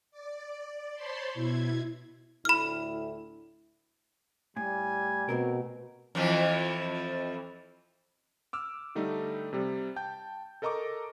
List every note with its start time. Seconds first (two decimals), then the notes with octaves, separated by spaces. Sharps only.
0.11 D5
0.94 C5 C#5 A5 B5 C6
1.34 B2 E4 G#6
2.45 D2 A2 E4 B5 F6
4.57 A2 G3 G#5
5.29 B2 A3 C4 A#4
6.15 F2 E3 F3
8.53 D6 E6 F6
8.95 D3 G3 A3 D#4
9.53 C3 G3
9.96 G5 A5 G6
10.62 A4 A#4 D#5 A#5 C#6 D6